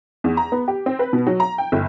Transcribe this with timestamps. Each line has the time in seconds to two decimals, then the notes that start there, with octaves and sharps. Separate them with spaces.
0.24 E2
0.37 A#5
0.52 B3
0.68 G4
0.86 C4
0.99 B4
1.13 B2
1.27 F#3
1.40 A#5
1.58 G5
1.72 G1